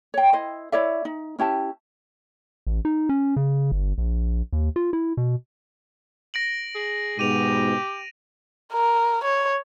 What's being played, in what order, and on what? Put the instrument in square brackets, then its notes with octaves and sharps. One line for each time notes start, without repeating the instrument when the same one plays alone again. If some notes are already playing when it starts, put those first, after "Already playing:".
[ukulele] C#5 G5
E4 C5 D#5
E4 C#5 D5 E5
D#4
C#4 E4 G4 A5
[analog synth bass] A1
D#4
C#4
C#3
G1
A#1
D#2
F4
E4
B2
[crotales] A#6 D7 F#7
[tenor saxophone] G#4
[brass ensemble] G#2 B2 [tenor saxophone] G4 [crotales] D#7 F7
[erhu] A#4
C#5